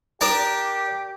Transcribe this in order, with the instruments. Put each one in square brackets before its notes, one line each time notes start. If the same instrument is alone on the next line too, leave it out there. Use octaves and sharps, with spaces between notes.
[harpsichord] D4 A#4 A5 [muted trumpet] G4